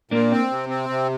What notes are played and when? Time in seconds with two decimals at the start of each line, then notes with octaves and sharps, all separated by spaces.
0.11 A#2 A#3 D4
0.31 C4
0.51 C3
0.69 C4
0.89 C3